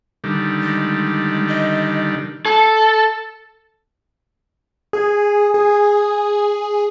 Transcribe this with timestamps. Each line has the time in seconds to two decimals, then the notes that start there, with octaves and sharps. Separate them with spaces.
0.24 D3 D#3 G3
0.63 G#3
1.48 D#5
2.45 A4
4.93 G#4
5.54 G#4